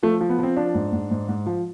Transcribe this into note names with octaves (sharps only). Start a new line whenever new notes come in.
F3 A3
F3
B3
F3 C4
F3 D4
G#2
G#2
G#2
G#2
F3